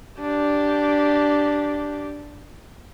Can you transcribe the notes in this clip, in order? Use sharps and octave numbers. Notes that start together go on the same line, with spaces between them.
D4 G4